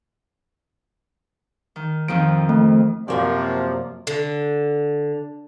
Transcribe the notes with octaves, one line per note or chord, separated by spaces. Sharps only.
D#3
F2 D#3 F3 D7
A3
F#2 C3 F3 F#3 A#3 D5
D3